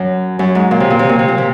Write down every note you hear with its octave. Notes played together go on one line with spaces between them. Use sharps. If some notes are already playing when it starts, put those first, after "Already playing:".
Already playing: F#2
F#2
G#2
A#2
C3
A#2
C3
A#2
C3
A#2
C3